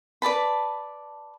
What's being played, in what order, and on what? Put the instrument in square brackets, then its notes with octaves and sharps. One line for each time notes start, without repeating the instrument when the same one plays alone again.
[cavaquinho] B4 D5 A5 B5